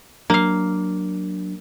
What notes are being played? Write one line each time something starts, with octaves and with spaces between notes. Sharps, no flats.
F#3 A#3 D4 F5